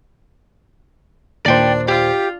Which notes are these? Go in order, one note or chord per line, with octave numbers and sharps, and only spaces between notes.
D#2 A#2 D4 C5 D5 G5
F4 G4